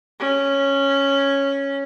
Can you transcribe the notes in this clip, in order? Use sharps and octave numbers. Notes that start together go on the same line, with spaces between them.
C#4